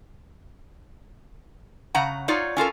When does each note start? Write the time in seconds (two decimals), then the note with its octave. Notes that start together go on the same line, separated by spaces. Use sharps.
1.95 C#3 F#5 A#5
2.28 D#4 F4 C#5 D5
2.57 C#4 F4 A4 A#4